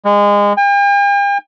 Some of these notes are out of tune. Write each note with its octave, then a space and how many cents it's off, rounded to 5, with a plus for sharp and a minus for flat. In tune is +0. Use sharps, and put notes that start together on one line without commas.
G#3 -25
G5 +45